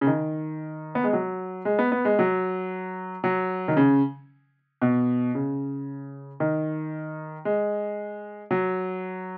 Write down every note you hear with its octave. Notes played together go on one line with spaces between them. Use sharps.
C#3
D#3
B3
G#3
F#3
G#3
B3
B3
G#3
F#3
F#3
D#3
C#3
B2
C#3
D#3
G#3
F#3